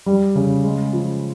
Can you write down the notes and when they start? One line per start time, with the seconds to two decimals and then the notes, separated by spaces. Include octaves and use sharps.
0.06 G3
0.35 C#3
0.64 G#3
0.93 F3